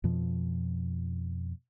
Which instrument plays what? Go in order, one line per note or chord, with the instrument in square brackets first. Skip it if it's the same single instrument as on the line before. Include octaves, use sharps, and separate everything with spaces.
[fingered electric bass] F2 B2 F3